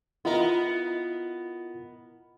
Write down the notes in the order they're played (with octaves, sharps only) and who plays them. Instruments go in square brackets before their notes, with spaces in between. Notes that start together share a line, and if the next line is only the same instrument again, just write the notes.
[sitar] B3 A#4 [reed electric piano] E4 F4 D#5